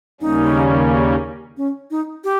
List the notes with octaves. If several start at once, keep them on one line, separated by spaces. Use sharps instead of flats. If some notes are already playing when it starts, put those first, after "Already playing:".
D#2 C#3 G3 A#3 C#4 D#4
C#4
D#4
G4